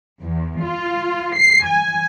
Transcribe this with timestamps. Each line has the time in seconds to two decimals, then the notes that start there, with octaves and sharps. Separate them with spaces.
0.23 E2
0.63 F4
1.35 C7
1.68 G#5